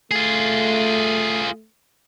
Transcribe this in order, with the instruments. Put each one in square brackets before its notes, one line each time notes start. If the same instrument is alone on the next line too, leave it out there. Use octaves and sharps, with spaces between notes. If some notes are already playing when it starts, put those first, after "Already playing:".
[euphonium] A3 [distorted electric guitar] F4 G#4